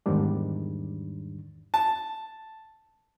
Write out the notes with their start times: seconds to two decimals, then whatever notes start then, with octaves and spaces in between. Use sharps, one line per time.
0.06 E2 G#2 D#3 G3 D4
1.74 A5